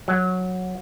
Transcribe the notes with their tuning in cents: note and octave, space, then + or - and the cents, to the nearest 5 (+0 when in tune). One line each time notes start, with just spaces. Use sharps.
F#3 -10